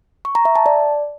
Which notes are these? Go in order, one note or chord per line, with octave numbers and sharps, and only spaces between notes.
C#6
A#5
E5
A5
D5